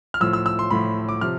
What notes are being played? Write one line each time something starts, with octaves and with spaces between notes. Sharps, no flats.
F6
A2 F3 E6
E6
E6
C6
A2 F3 B5
D6
C3 F3 F6